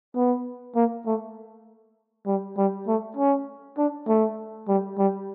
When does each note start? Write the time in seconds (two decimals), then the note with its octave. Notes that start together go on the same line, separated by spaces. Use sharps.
0.15 B3
0.75 A#3
1.06 A3
2.26 G3
2.57 G3
2.87 A3
3.17 C#4
3.78 D4
4.08 A3
4.68 G3
4.98 G3